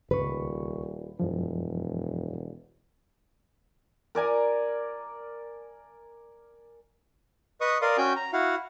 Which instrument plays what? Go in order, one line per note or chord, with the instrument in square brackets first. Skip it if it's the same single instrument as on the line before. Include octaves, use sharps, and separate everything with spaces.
[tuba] D#1 [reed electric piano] C#2 C#6 [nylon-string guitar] B4
[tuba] E1 [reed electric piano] F#2 F3
[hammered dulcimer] A#4 D5 G#5 A#5
[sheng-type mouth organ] B4 D#5 C#6 D#6
A#4 D5 F5 C6 D#6
C#4 F#4 G5 G#5 G6
A#5
E4 F#4 F5 F#5